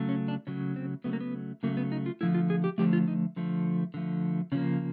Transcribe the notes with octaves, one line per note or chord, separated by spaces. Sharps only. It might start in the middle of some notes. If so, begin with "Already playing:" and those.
Already playing: C#3 F#3 A3
C#4
D4
C#3 F#3 A3 C#4
C4
C#3 F#3 A3 B3
A#3
B3
C#3 F#3 A3 A#3
B3
D#4
F4
D3 F3 A3 E4
F4
G#4
G4
D3 F3 A3 G4
F4
D#4
D3 F3 A3
D3 F3 A3
C#3 F3 A#3 C#4